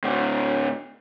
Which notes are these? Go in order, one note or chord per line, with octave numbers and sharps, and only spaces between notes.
A2 D3